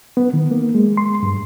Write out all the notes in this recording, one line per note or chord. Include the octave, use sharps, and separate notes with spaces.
B3
D#3
A#3
G#3
C6
G2